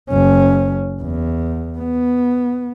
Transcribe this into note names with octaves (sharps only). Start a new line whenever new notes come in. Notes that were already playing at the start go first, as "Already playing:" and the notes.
F#1 C#4
E2
B3